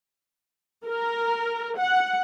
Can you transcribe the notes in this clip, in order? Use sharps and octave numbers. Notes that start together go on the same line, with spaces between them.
A#4
F#5